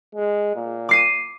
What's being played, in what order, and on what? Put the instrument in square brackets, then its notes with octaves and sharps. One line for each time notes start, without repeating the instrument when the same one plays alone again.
[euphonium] G#3
A#2
[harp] D6 C7 D#7